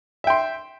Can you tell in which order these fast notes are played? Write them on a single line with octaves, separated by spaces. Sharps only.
E5 G5 C6